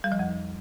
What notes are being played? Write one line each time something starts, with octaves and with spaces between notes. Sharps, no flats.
G3
F3
F2